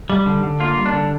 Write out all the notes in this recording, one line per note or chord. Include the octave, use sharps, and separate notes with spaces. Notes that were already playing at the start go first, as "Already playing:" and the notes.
G3
D3
D3
A#3 F4
G3
D4
D3